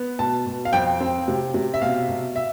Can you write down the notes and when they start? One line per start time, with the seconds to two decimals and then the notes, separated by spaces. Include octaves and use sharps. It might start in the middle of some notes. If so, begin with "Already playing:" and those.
Already playing: B3
0.19 B2 A5
0.46 B2
0.65 F5
0.73 F2 G5
1.00 C4
1.28 C3
1.54 C3
1.74 E5
1.82 B2 F5
2.09 B2
2.36 E5